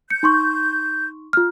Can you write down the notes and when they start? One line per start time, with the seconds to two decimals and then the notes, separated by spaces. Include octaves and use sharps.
0.10 G6 C#7
0.23 D#4 C6 C#6
1.33 F4 F6